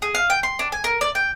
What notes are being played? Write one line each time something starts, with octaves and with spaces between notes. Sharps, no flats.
G#4
F5
G5
C6
D4
G#5
A#4
D5
G5